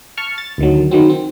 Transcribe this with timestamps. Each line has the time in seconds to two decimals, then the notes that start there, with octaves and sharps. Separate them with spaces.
0.17 A5 C#6 F6
0.38 A6
0.58 D2 D#3 F#3
0.91 D#3 F#3 C4
1.09 C4